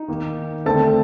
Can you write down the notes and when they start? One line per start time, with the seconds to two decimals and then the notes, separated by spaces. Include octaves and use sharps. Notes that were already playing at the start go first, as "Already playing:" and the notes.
Already playing: D#4
0.08 D#3 A#3
0.66 D3 A3 C4 A4 A5